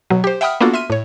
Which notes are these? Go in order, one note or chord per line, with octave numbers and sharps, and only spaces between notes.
B2 F#3
G4 C5
E5 F#5 G5 B5 D#6 F6
A#3 B3 D4 F4 F#4 A4
E5 C6 F6 D#7
A2 C#5